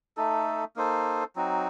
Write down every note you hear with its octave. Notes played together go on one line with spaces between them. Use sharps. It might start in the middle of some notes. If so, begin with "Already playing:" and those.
A3 D#4 A4
A#3 D#4 A4 C5
F#3 C4 D#4 F#4